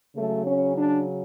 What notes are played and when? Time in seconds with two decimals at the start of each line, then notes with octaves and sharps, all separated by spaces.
0.16 C#3 F#3 A3
0.45 C#4
0.73 D4